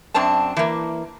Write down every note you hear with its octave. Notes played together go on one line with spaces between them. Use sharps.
F#2 C4 D4 A5
E3 A#3